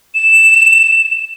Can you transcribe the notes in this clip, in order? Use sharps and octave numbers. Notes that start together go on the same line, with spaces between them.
E7